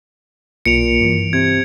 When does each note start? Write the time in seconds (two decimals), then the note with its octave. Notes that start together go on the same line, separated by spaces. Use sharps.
0.66 B1 A#2 C#7 D7 F7
1.01 G2 E3
1.33 C3 G#6